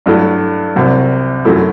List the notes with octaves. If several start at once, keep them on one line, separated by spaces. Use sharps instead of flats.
G2 F#3 A3 E4
C2 C3 F#3
F#2 F#3 A3 E4